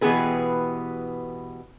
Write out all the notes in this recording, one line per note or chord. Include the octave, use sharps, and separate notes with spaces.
B2 E3 B3 G4 G#4 B4